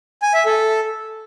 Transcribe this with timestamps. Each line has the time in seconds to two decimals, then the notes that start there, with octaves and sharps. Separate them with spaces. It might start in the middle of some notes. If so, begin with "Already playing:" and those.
0.22 G#5
0.34 E5
0.46 A4